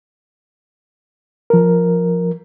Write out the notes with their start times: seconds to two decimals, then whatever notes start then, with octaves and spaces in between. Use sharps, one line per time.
1.50 F3 A#4